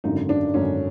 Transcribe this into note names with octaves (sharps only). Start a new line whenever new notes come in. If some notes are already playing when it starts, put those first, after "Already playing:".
G#1 F#2 D3 D#4
D4
G#1 F#2 D3 C#4